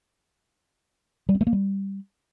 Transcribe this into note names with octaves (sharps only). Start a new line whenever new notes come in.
G3
C4
A3
A#3
G3